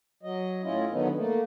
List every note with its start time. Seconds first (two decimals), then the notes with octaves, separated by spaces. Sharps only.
0.23 F#3 D#5
0.63 A2 C#4 E4 F4 D#5
0.91 D3 D#3 F#3 B3 C#4 D#4
1.15 A3 A#3